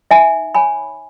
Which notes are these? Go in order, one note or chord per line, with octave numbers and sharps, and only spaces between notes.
D#4 E5 G#5
C#5 G#5 B5